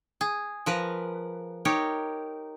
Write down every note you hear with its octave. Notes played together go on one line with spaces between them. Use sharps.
G#4
F3 A#4 B4
D#4 G4 A#4 C#5